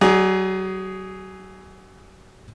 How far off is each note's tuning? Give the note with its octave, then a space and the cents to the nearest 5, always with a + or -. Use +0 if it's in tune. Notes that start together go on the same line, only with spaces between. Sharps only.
F#3 +35 G#4 +0 D5 +30